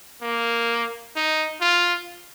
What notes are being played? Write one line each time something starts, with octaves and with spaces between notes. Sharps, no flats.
A#3
D#4
F4